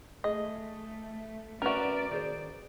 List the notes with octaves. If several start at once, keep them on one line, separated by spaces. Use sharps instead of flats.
A3 G#4 D#5
C#4 F#4 A#4 B4 D5 E5
D#3 G#4 C5